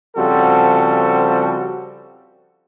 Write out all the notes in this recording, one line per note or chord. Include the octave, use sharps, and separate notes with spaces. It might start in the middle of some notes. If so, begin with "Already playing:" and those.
C#3 F3 G3 C4 F#4 A4